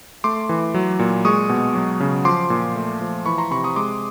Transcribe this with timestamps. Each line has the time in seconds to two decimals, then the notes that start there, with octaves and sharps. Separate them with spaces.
0.24 A3 C6 D6
0.49 E3
0.74 F#3
0.99 A#2
1.25 G#3 C#6 D#6
1.49 B2
1.75 F#3
2.00 C#3
2.25 F3 C6 D6
2.50 A#2
2.76 A3
3.01 F3
3.26 E3 B5 C#6
3.38 A#5 C6
3.51 C3 B5 C#6
3.64 C#6 D#6
3.76 G#3 C6 D6